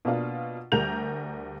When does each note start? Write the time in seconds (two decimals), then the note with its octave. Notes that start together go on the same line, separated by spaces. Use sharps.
0.05 B2 A#3 D4 F4
0.72 D2 G3 A#4 G6 F7